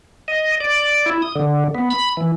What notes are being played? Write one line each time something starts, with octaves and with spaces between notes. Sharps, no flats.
D#5
D5
E4
D#6
D3
B3
B5
E3